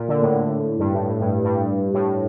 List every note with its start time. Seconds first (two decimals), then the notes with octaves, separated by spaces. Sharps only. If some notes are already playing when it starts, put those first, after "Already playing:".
Already playing: A#2
0.08 D3
0.22 A2
0.79 G2
0.94 A2
1.08 A2
1.20 G2
1.45 G2
1.94 A2